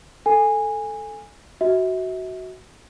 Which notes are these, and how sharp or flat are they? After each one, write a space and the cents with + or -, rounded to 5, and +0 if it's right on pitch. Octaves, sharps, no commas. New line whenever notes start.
A4 +0 G#5 -15
F#4 +10 E5 -35